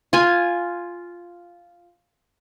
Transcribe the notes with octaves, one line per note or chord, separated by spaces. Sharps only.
F4 G#5